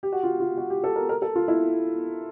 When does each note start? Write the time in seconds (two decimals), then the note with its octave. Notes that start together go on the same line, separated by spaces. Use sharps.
0.03 G4
0.12 F#4
0.23 F4
0.40 F4
0.58 F#4
0.70 G4
0.84 A4
0.96 A#4
1.09 A#4
1.22 A4
1.35 F4
1.48 E4